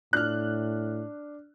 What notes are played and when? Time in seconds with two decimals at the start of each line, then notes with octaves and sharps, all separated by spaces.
0.13 A2 D4 F6 F#6